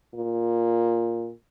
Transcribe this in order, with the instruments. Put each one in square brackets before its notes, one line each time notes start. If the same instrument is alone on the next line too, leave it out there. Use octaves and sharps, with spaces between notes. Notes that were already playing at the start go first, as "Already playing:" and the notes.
[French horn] A#2